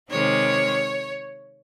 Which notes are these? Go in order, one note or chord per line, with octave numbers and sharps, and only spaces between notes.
C3 D#3 G#3 C4 C#5